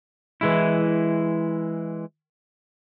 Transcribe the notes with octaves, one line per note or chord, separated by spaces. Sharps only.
E3 G#3 E4